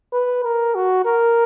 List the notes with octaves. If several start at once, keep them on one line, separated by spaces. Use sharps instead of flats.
B4
A#4
F#4
A#4